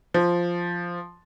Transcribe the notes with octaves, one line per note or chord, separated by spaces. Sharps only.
F3